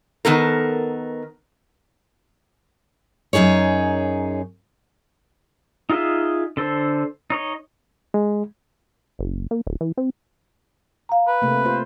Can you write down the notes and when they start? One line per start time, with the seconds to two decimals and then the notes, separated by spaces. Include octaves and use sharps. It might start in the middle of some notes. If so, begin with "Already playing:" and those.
0.25 D#3 B3 A4 A#4
3.33 F#2 C3 D#4 G#4 C#5
5.90 D#4 F4 G#4 D#5 E5
6.57 D3 A4 C5
7.30 D#4 C#5 D#5
8.14 G#3
9.19 F#1
9.51 A#3
9.67 D1
9.81 E3
9.97 C4
11.09 F5 A#5
11.27 B4
11.42 C3 A3 A#3
11.65 F4 C5